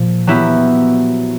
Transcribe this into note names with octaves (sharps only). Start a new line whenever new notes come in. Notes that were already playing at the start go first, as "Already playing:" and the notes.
Already playing: A#2 F3
F#3 B3 E4 G4